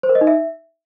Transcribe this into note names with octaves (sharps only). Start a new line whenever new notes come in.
C5
A#4
D#5
D#4
E5